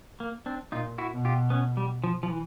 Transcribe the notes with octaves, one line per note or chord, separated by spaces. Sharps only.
A#3
C4 D4
A#2 D#4 F4
E4 F#4
B2
F4 G4
B3 C#4
G3
F3
F3
E3